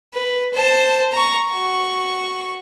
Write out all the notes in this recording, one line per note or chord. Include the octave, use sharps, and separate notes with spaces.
B4
C5 A5
A#5 C#6
F#4 C#6